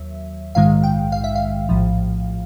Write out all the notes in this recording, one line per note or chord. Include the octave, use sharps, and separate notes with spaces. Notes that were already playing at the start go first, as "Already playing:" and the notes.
Already playing: D#2 F#3 E5
A#1 G#2 D#3 G#3 F5
G5
F5
E5
F5
A#1 A2 F3